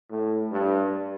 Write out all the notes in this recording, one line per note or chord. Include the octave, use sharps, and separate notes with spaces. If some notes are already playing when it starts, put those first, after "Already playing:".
A2
G2